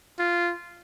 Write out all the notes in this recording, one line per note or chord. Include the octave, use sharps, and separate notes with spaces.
F4